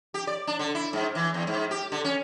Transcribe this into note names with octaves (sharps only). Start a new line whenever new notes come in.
G4
D5
D4
D3
E4
G#2
E3
E2
G#2
G4
D3
C#4